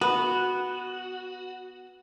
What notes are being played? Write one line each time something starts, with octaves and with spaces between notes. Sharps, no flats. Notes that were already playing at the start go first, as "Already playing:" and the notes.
B3 F#4